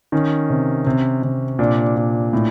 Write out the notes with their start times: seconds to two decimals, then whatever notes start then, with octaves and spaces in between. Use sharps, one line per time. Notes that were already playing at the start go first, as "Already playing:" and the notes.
0.12 D#3 C#4
0.50 C3
0.87 C3
1.23 C3
1.59 A#2 D4
1.97 A#2
2.33 A2